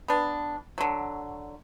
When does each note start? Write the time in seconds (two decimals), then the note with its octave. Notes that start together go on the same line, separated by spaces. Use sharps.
0.08 B3 D4
0.78 D3 F#3